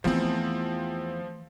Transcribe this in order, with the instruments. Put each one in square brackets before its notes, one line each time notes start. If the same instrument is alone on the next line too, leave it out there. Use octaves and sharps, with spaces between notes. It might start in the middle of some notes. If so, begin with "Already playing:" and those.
[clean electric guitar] E2 [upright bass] E3 A3 [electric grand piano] F3 C4